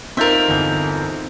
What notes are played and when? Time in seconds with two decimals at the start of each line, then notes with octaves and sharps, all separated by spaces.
0.17 C4 D#4 F4 A#4 E5 C6 G6 A6
0.48 G1 E2 G6